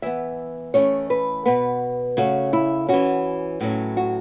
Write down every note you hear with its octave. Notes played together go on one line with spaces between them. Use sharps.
E3 B3 E5
E3 A3 C#4 C#5
B4
B2 B3 B4
C#3 A3 C#4 F#4
E4
E3 C#4 F#4
A2 F#3 C#4
F#4